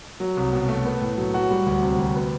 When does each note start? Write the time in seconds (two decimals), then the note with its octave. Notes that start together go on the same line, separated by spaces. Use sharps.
0.20 F#3
0.37 C2
0.53 B2
0.69 A3
0.85 B3
1.01 A2
1.17 F#3
1.34 F#4
1.51 G3
1.67 D2
1.82 C3
1.99 D2
2.15 B3